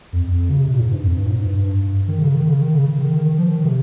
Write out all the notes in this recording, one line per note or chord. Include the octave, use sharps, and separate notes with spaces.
F2
F2
C#3
C3
A#2
G#2
G2
F2
G2
A#2
G#2
G2
G2
D#3
C#3
D#3
C#3
D#3
C#3
C#3
D#3
D#3
D#3
F3
D#3
C3